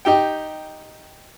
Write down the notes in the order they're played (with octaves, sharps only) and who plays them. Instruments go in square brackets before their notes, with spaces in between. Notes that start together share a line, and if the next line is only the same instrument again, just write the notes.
[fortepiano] D#4 G4 G5